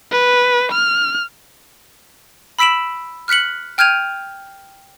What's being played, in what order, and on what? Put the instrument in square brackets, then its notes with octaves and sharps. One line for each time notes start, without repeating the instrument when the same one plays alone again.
[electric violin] B4
F6
[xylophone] B5 E6 B6 D7 E7 F#7
F6 F#6 B6 C#7 F#7
G5 F6 G6 G#6 D#7 F7